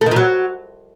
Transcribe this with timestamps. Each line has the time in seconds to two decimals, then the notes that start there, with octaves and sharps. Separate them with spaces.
0.01 A3
0.06 D#3
0.11 A#2
0.16 F#3